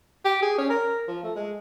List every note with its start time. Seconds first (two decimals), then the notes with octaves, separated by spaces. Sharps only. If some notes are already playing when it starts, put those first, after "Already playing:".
0.25 G4
0.43 G#4
0.58 C#4
0.70 A#4
1.08 F3
1.24 A3
1.36 G#3